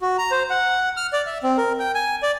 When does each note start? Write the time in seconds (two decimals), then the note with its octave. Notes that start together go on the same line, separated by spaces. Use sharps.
0.01 F#4
0.18 A#5
0.31 C5
0.50 F#5
0.97 F6
1.13 D5
1.26 E5
1.43 C4
1.58 A#4
1.79 G5
1.95 G#5
2.22 D5